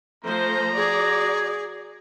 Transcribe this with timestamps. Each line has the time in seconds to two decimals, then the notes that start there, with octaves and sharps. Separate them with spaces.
0.24 F3 A3 C5 A#5
0.76 F#4 G#4 D5